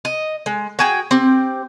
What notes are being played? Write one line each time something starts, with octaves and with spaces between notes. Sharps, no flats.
D#5
G#3
F#4 G#4 G5
C4 G4